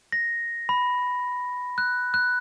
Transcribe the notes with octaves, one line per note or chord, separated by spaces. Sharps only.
A#6
B5
F#6
F#6